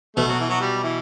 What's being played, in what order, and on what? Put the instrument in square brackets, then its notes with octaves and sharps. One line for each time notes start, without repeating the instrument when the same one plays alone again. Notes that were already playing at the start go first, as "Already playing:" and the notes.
[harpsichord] B2 [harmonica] A3
[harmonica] F#3
E3
F#3
G3
E3